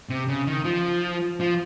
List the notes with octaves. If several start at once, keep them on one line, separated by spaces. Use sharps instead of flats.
C3
C#3
D#3
F3
F3